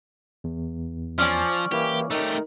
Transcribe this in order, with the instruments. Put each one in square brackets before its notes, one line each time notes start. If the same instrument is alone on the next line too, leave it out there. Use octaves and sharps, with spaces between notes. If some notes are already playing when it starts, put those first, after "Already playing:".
[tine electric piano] E2
[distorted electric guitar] F3 [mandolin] C#4 D5 G#5
[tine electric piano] E3 A#3 E4 [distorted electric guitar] G4
[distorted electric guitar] A3 G4 [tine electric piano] D#4 A#4